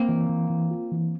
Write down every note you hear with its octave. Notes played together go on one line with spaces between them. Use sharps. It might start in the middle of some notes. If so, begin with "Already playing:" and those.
Already playing: A#3 C4
E3
E3
E3
F4
E3